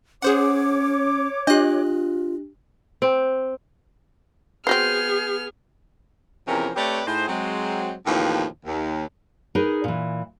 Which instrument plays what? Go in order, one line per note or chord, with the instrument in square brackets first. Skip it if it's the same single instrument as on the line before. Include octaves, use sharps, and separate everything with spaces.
[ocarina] C#4 [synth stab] G#4 C5 F#5 [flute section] C#5 D6
[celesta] D4 G4 [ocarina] F4 [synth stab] D#5 F#6
[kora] C4
[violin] B3 F6 [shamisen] C4 F#4 C5 [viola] G#4 [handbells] G6 C7
[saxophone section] E2 C3 F3 C#4 A#4
A3 C4 G4 B4 C#5 D5
A2 D#4 E4 G#4 C5
F#3 G#3 C4
D#2 A2 C#3 E3 F3 C4
D#2
[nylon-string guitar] D#4 G#4 A#4 B4
A#2 E3